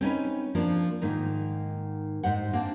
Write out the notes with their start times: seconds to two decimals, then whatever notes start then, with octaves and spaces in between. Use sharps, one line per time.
0.01 C4 C#4 D#4 B4
0.55 F3 A#3 D4
1.02 G#2 D#3 A#3
2.23 G#2 C5 F#5
2.53 A#3 C4 D4